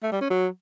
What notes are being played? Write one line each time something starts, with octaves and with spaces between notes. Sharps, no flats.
A3
G3
C#4
F#3